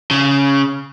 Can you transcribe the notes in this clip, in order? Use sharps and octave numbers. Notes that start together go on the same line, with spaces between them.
C#3